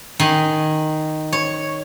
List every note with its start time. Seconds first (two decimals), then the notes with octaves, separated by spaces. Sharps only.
0.20 D#3 G#5
1.33 C#5